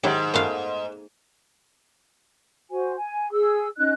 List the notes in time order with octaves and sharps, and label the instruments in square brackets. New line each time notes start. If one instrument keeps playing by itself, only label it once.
[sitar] G#2 [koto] D#3 F#3 E4 [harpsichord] G4 C#5
[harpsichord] F#2 [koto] A3 B3 F5
[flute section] F#4 C5 G#5
G#5
G#4 E6
C#4 D#4 D#5 F#6